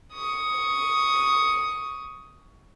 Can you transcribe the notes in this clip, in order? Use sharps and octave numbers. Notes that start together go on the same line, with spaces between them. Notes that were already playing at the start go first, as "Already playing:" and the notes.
C#6 D#6